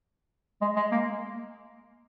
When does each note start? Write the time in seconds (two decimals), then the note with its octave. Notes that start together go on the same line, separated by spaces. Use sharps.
0.61 G#3
0.76 G#3
0.91 A#3